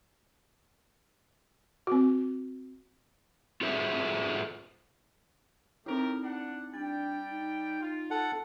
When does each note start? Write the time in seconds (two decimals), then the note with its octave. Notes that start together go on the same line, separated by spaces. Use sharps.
1.87 C4 F#4
3.61 F4 F#4 G#4 A4 C5 E5
5.86 A3 C4 D#4 E4 G4 A#4
6.23 D4 F#5
6.74 G3 D4 G5 A6
7.30 D#4
7.81 F4
8.11 A4 F#5